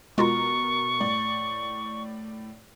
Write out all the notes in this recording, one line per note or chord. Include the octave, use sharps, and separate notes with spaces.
B2 G#3 F4 F#4 A#4 A#5 C#6
A2 D5